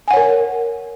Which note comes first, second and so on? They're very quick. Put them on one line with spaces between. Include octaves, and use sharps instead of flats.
G#5 F#5 C#5 A#4